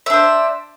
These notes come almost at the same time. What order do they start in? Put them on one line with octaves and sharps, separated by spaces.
E5 D4 C5